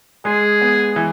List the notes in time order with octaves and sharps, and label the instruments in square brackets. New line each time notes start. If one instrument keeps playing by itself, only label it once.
[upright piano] G#3 [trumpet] G#4
[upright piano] B3
E3